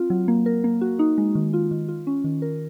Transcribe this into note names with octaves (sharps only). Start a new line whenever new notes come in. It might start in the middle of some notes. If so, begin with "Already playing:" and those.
Already playing: C4 F4
F#3
A#3
A#4
A#3
F#4
D#4
G#3
D#3
F4
D#3
F4
C#4
D#3
A#4